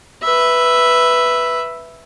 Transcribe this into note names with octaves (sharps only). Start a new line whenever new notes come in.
B4 E5